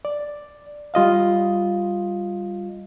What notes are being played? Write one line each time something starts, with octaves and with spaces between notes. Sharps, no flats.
D5
G3 F4 D#5 F5